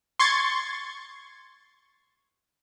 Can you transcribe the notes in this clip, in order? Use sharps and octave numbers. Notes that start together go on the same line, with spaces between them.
C6 C#6 G#6 A6